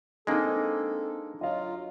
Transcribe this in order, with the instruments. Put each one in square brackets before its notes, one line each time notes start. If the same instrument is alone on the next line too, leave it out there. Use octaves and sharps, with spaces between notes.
[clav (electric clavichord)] G#3 A#3 [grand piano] C4 [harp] D4 D#4 [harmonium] A4
[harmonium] F#3 F4 [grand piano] D#5 F5